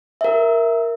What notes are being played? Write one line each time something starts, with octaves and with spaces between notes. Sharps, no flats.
A#4 E5